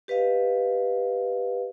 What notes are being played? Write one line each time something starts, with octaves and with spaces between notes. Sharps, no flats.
G4 B4 D#5 F5